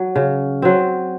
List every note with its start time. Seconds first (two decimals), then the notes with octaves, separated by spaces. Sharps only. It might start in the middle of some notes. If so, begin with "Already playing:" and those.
Already playing: F#3
0.16 C#3
0.62 F#3 C4